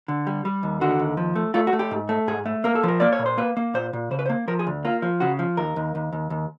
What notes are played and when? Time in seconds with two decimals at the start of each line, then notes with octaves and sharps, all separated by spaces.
0.08 D3
0.27 G3
0.45 G3
0.63 D#2
0.81 D3 F#4
0.99 D#2
1.17 F3
1.36 A3
1.54 A3 F4
1.67 F#4
1.73 A3
1.79 G4
1.91 G#2
2.09 A3
2.27 G#2 G#4
2.46 A3
2.64 A#3 A#4
2.75 A4
2.83 F3 A#4
3.00 A#3 D5
3.13 C#5
3.19 A#2
3.26 C5
3.38 A#3 B4
3.57 A#3
3.74 A#2 C5
3.93 A#2
4.11 C#3 C5
4.19 B4
4.26 C5
4.29 A#3
4.48 F3 A#4
4.59 G#4
4.67 D2
4.85 A#3 F4
5.02 F3
5.20 C#3 F#4
5.39 F3
5.57 D#2 A#4
5.76 D#2
5.95 D#2
6.13 D#2
6.30 D#2